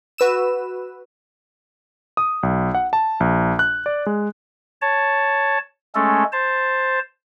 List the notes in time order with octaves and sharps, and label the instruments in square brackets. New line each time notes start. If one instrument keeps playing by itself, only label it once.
[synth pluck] F#4 B4 E6 E7
[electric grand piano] D#6
B1
F#5
A5
A#1
F#6
D5
G#3
[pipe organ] C#5 A5
G#3 A3 C#4 A4
C5 A5